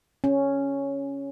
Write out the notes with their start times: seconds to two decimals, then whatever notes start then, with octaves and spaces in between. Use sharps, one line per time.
0.24 C#4